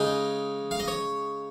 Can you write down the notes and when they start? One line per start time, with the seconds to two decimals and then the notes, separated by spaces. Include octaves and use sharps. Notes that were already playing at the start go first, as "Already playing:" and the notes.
Already playing: C#3 G#3 D#4 G#5
0.71 F5
0.79 D#5
0.88 C#5